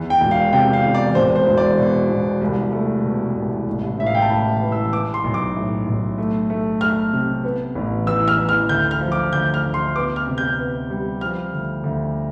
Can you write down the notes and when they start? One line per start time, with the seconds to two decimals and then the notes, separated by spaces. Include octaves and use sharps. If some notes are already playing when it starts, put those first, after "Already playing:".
Already playing: E2
0.10 G5
0.21 E1
0.31 F5
0.52 C3 G5
0.73 F5
0.84 E2
0.95 D5
1.15 E1 C5
1.36 C5
1.47 E1
1.58 D5
1.78 B2
2.09 E1
2.41 C2
2.73 A3
3.04 B2
3.36 C2
3.67 A1
3.98 A2 E5
4.06 F5
4.15 G5
4.22 A5
4.29 A1 B5
4.62 E3
4.72 E6
4.92 E3 D6
5.14 C6
5.24 B1
5.34 D6
5.56 A2
5.86 B1
6.18 A3
6.50 A3
6.81 A3 F6
7.13 C3
7.44 B3
7.75 A1
8.07 E3 E6
8.28 F6
8.38 E3
8.49 F6
8.69 D2 G6
8.91 F6
9.01 F3
9.12 D6
9.33 D2 G6
9.54 F6
9.64 D2
9.74 C6
9.95 B3 D6
10.16 F6
10.27 C3
10.38 G6
10.59 B3
10.90 G3
11.21 F3 F6
11.53 D2
11.84 D2